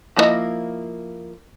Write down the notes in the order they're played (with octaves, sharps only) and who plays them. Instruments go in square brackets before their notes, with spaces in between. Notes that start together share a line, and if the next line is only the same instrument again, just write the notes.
[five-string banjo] F3 A#3 D4 E4 D#5